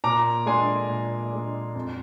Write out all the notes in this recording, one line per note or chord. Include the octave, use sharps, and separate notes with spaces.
A#2 A#5 D6
G#3 D4 G#5 C6
A#2
G#3 D4
F2